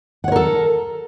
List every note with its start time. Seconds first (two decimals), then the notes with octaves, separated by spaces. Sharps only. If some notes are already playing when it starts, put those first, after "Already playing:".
0.24 F#5
0.28 C#5
0.32 A#4
0.36 A4